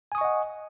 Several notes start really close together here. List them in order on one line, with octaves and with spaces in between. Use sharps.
G#5 D#6 C#6 D#5 F#5